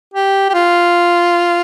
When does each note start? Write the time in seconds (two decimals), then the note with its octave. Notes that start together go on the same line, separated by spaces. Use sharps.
0.14 G4
0.50 G4
0.54 F4